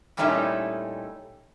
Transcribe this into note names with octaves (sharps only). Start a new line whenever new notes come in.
A#2 G3 A3 C#4 D#4 E4